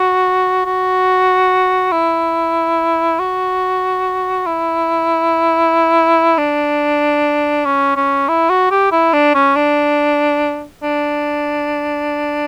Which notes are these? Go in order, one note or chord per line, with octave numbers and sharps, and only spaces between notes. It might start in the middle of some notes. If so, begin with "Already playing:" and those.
Already playing: F#4
F#4
E4
F#4
E4
D4
C#4
C#4
E4
F#4
G4
E4
D4
C#4
D4
D4